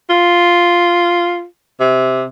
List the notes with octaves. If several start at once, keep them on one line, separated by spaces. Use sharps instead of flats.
F4
C3